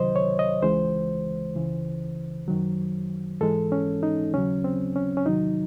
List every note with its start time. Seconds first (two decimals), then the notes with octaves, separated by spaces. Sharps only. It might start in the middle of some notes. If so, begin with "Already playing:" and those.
Already playing: C#2 C3 D#3 F#3 C5 D#5
0.16 C#5
0.39 D#5
0.63 C#2 C#3 E3 G#3 C5
1.55 C#2 C#3 E3
2.48 F#2 D#3 F#3
3.41 G#2 E3 G#3 A4
3.72 C#4
4.03 D#4
4.33 D#2 C#3 F#3 C#4
4.64 C4
4.96 C#4
5.17 C#4
5.26 E2 C3 D#3 F#3 D#4